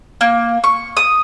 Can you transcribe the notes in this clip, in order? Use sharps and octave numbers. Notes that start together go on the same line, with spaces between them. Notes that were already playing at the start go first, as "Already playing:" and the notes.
A#3
C#6
D#6